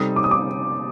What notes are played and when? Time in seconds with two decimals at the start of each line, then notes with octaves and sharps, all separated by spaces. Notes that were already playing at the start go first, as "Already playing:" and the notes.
Already playing: C3 G3 C4 D#4 A4 D#6
0.16 D6
0.24 D#6
0.31 D6